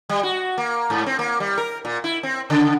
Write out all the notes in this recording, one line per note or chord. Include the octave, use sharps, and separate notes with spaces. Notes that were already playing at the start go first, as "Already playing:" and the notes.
G3
F#4
A#3
G#2
C4
A#3
G3
A#4
A#2
E4
C4
C#3